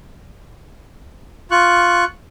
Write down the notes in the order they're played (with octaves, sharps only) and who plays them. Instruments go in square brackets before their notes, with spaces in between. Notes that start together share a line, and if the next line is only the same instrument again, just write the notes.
[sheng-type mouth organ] F4 C#6 F#6